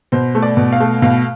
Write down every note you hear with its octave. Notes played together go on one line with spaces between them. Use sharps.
B2 C5
A3
D5
B2
F5
A3
B2 F5